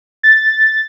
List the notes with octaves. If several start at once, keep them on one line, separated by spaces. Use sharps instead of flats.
A6